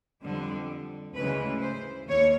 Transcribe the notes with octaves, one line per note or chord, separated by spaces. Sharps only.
F2 D3 G3
D2 C#3 E3 G#3 B4
C5
D#2 C#5